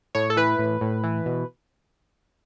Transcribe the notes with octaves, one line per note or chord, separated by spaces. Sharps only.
A2 C#5
A4
E3 B4
A2
A2
E3
B2